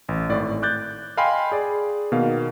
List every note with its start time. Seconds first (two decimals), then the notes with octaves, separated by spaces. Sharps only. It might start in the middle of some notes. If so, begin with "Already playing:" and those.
0.09 A1
0.29 G#1 A2 D5
0.62 D6 F#6 G6 A6
1.17 D#5 F5 G5 G#5 B5 C6
1.52 G#4 D5
2.12 B2 D#3 A#3 F5